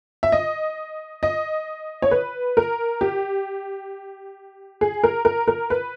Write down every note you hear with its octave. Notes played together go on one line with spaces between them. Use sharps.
E5
D#5
D#5
C#5
B4
A#4
G4
G#4
A#4
A#4
A#4
B4